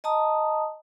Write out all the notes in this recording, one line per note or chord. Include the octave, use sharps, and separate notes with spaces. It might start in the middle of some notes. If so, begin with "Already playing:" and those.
D#5 A5 A#5 D#6